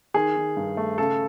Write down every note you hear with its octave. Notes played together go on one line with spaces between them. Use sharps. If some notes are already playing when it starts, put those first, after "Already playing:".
D#3 G#4
D#3
G2
A3
C#3 A4